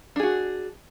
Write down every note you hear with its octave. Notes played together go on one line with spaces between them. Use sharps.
D4 F#4 G#4